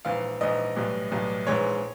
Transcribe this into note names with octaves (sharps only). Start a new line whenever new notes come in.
A#1 G#2 E3 F5
A#1 G#2 E3 D#5
B1 A2 E3 G3
B1 A2 E3 G3
A#1 G#2 E3 G#3 C#5